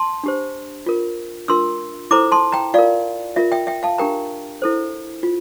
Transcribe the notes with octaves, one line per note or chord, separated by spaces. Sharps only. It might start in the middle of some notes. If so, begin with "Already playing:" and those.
Already playing: A5 C6
D4 G4 C5
F4 A#4
D4 F4 A#4 C6 E6
E4 A4 C5 A#5 D6
A5 C6
G5 A#5
F4 A#4 D5 F5
F4 A#4 E5
E5 G5
E5 G5
F5 A5
D4 G4 A#4 G5 A#5
E4 A4 C5
F4